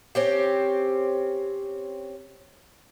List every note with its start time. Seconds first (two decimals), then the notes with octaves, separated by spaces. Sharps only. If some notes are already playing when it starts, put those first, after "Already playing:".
0.15 C4 C#4 G4